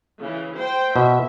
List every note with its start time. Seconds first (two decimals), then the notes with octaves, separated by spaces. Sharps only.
0.19 C#3 E3
0.58 C5 G5
0.96 B2 E5